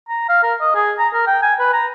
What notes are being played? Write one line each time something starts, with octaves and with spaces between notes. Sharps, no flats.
A#5
F5
A#4
D#5
G#4
A#5
A#4
G5
G#5
B4
A#5